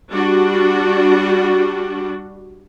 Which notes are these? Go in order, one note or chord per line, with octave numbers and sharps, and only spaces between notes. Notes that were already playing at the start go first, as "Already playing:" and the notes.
G3 D4 F#4